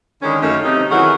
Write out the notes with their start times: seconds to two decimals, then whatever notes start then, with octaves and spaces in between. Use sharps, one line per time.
0.22 D3 D#3 G#3 C#4
0.42 F#2 A3 A#3 C#4 D#4
0.63 C3 D#4
0.91 D#3 E3 F#3 F#4 G#4 A#4